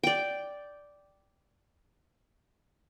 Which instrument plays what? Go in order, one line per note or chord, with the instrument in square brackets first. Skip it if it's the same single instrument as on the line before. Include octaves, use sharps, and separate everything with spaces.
[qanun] D5 G5